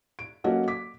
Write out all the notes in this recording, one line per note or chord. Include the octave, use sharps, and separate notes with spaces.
D7
F#3 A#3 C#4 F#4 A4 D#5
D6 B6